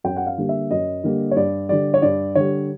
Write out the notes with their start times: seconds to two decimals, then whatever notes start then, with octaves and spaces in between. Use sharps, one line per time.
0.04 F#2 G5
0.16 F#5
0.27 F5
0.38 D3 G3 A#3
0.49 E5
0.71 F#2 D#5
1.04 D3 G3 A#3
1.31 C#5
1.36 G2 D5
1.69 D3 G3 D5
1.94 C#5
2.02 G2 D5
2.35 D3 G3 C#5